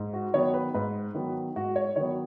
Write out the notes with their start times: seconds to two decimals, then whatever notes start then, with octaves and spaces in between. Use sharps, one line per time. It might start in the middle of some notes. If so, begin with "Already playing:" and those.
Already playing: G#2
0.13 F#4
0.34 D#3 F#3 B3 C#5
0.54 B4
0.74 G#2 B4
1.15 D#3 F#3 B3
1.56 G#2 F#4
1.76 C#5
1.96 D#3 F#3 B3 C#5